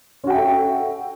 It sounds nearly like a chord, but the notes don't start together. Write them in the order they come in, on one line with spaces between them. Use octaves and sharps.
C#4 F#4 G5 E5 A4